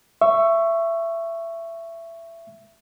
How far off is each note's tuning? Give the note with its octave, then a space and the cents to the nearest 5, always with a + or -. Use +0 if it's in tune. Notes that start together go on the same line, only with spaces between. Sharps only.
E5 +20 C#6 +0